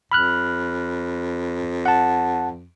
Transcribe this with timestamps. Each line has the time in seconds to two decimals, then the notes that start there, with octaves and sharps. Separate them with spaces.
0.12 F2 B5 F6 F#6
1.86 F#5 A5